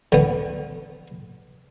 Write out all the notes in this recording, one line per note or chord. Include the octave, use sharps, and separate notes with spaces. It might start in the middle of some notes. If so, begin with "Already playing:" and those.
D3 B3